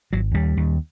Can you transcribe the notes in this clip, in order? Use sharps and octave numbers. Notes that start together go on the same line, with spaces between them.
G#1 F#3
D#2 G3
D#2